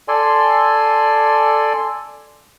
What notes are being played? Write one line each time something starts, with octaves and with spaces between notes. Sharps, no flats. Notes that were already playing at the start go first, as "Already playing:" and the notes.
A4 D5 G#5 C6